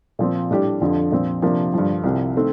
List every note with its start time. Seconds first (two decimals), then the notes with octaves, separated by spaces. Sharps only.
0.19 A#2 F3 C4
0.51 A2 G3 D4 G4
0.81 F2 D3 F3
1.12 A#2 F3 C4
1.42 C3 F3 A#3 D4
1.74 G2 D3 F3
2.04 C2 C3 F3
2.36 D#3 A3 C4